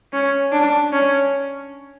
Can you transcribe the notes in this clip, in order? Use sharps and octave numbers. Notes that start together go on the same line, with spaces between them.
C#4
D4
C#4